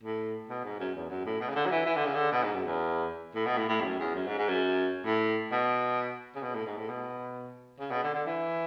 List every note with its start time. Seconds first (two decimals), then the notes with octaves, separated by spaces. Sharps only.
0.04 A2
0.50 B2
0.65 G#2
0.80 F#2
0.95 E2
1.10 F#2
1.26 A2
1.41 B2
1.49 C#3
1.56 D3
1.66 F#3
1.71 E3
1.86 E3
1.96 D3
2.05 C#3
2.15 D3
2.32 B2
2.43 G#2
2.55 F#2
2.66 E2
3.35 A2
3.46 B2
3.57 A2
3.69 A2
3.80 E2
3.84 F#2
4.00 E2
4.15 F#2
4.26 G#2
4.38 G#2
4.49 F#2
5.06 A2
5.52 B2
6.35 C#3
6.43 B2
6.55 A2
6.66 G#2
6.77 A2
6.89 B2
7.80 C#3
7.91 B2
8.03 D3
8.14 D3
8.26 E3